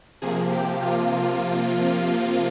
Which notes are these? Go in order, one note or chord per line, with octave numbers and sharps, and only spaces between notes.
C3 F3 A#3 G#4
G4
C3 F3 A#3 F4